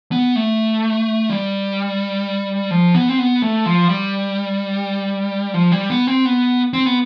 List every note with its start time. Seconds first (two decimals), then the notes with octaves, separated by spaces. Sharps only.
0.12 B3
0.36 A3
1.30 G3
2.71 F3
2.95 B3
3.09 C4
3.18 B3
3.42 A3
3.66 F3
3.89 G3
5.54 F3
5.72 G3
5.90 B3
6.07 C4
6.25 B3
6.73 C4
6.86 B3